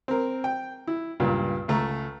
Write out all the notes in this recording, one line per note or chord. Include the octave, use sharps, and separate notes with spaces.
C4 A#4
G5
E4
C#2 G2 A#2
C#2 A3 E5 A#5 C#6